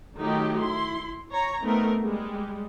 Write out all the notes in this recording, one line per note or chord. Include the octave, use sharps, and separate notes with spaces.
D#3 F#3 A3 D#4 F4 G4
E4 C6
C#5 A#5
A3 B3 C4 D#4 A#4
G3 G#3